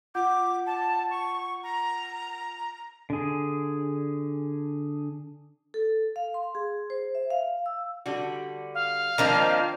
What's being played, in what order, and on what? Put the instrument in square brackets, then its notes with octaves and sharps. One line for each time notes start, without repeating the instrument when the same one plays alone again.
[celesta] F4 F#5 G6 [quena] D6
[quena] A5
C#6
A#5
[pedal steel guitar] D3 G#4
[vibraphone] A4
F5
C6
G#4
C5
E5
F5
E6
[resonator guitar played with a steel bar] D3 G3 F#4
[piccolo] F5
[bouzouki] D#3 F3 A#3 [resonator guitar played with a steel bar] C4 D4